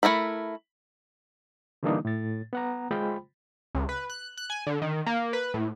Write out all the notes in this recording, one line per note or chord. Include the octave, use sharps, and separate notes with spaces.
A3 E4 A#4 B5
D3 E3 G3 A#3 D4 D#4
A2 A6
B3 F#5 A#5
G#3 F4 C5 G5 B5
C#2
B4
F#6
F#6
G#5
D3
D#3
A#3
B4
A2